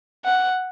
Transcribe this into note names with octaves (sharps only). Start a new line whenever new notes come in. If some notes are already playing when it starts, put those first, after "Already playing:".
F#5